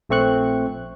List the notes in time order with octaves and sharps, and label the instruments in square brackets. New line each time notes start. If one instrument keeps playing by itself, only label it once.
[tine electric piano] A#1 A3 C4 C#6 F#6